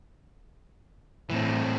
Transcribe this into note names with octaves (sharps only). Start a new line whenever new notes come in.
A2 E3 C4